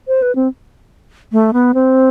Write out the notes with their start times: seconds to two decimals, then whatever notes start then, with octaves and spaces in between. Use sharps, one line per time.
0.08 C5
0.22 B4
0.35 C4
1.32 A3
1.53 B3
1.74 C4